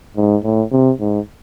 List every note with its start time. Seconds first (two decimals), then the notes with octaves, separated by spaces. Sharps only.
0.17 G#2
0.43 A2
0.72 C3
1.00 G#2